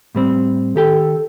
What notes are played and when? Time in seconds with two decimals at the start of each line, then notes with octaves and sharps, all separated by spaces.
0.15 A2 G3 C4
0.76 D#3 G4 A4 G5